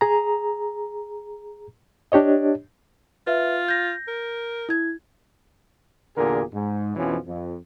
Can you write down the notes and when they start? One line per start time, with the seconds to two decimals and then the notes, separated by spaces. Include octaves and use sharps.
0.01 G#4 A#5
2.12 D4 G4 C#5 D#5
3.27 F4 B4 E5
3.68 G6 A#6
4.08 A#4
4.69 E4 G#6
6.17 E2 A#2 D3 G4 G#4 A#4
6.53 G#2
6.96 F2 B2 E3 F3 C#4
7.26 F2